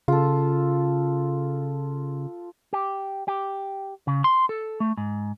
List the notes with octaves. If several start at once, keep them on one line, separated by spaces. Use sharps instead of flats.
C#3 F4 A4
G4
G4
C#3
C6
A4
A3
G#2